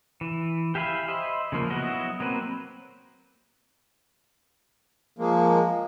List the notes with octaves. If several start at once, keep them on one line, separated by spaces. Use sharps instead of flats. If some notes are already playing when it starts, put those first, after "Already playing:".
E3
G4 E5 F5 G#5 B5
C5 D#5 E5 B5
C#3 F3 A#3
F#3 B3 E4 F#4 D#5
F#3 A#3 C4 B4
F3 G#3 A#3